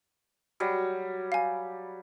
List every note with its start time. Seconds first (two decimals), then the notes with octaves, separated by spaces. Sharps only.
0.60 F#3 G3
1.32 F5 G#5